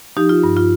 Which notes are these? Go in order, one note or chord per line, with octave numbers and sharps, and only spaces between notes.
F3 D#4 G4
F4
G2
F4